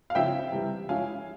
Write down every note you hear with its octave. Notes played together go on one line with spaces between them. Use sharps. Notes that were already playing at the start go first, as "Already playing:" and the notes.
F5
C#3 F3 C4 E4 E5 G5
C3 E3 G3
F3 G#3 C#4 E4 F5 G#5